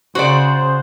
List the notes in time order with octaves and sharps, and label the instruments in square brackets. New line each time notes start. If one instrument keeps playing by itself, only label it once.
[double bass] C#3 [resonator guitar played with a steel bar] F#4 D5 [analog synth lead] C5